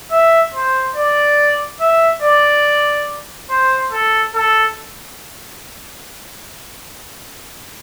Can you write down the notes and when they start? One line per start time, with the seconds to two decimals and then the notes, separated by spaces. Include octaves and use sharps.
0.11 E5
0.54 C5
0.96 D5
1.81 E5
2.23 D5
3.50 C5
3.92 A4
4.35 A4